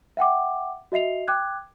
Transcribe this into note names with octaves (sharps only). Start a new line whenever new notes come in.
E5 F#5 G5 D6
F#4 D#5 E5 C7 F7
G5 D6 F#6 G#6